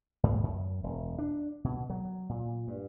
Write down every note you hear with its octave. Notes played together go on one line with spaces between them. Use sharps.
G#2
F#2
E1
D4
B2
F#3
A#2
G2